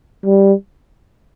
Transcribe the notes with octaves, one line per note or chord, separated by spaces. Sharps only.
G3